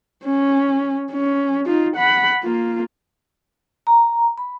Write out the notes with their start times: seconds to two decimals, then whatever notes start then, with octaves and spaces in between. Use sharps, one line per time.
0.24 C#4
1.12 C#4
1.66 D#4 F4
1.96 F#5 B5
2.43 A#3 F4
3.87 A#5
4.38 B5